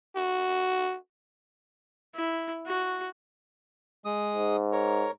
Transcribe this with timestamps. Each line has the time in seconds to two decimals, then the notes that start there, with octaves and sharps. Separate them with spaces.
0.16 F#4
2.15 E4
2.67 F#4
4.05 G#3 D#6
4.35 G#2
4.72 A#4 C#5